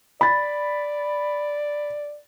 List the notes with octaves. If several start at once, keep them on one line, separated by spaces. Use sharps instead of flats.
D5 B5 A6